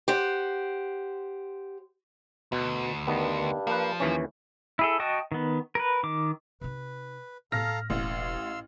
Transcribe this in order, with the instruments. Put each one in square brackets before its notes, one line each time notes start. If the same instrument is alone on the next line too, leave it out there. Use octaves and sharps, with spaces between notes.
[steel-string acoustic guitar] G4 C5 F#5
[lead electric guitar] D2 [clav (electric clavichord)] B2
[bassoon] G2 [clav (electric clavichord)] D#3 B3
[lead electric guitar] F3 [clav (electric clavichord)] A#3 B4
[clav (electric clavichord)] D#2 E3 C#4
[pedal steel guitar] E4 G#4 A4
F#4 D#5 G5 A5 D#6
D#3 B3
A#4 B4
D#3 D6
[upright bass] C3 D#4 [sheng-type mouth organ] B4
[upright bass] A2 [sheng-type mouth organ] A4 F5 A#5 [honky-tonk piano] F6 A#6
[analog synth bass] E1 [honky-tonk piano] A1 [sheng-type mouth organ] F5 C6 E6